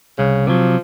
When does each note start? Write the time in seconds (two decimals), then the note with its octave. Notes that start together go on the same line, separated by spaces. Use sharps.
0.19 C2 C#3
0.47 C3 F3 F#3